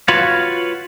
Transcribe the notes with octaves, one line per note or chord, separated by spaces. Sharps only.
F4 F#4 B4 C#5 F5